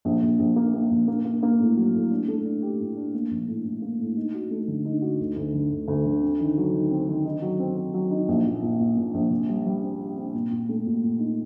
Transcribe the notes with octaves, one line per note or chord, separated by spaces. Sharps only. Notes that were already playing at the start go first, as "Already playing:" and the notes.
A#1
A#1
A#1
A#3
A#3
A#1
A#3
A#3
A#3
A2
F#3
A2
D4
A3
D4
G4
A2
D4
A#3
A#1
A2
A2
A#3
A2
D#4
F#4
A3
D3
D#4
F#4
D2
D2
D3
D2
D2
D3
C4
D#3
F#3
D#3
C4
D#3
D#4
F#3
C4
C4
F#3
D#4
A#1
A#2
A#2
A#2
A#2
A#1
C3
G3
G3
C4
G4
C4
A#2
A#2
A3
A#2
A#2
D#4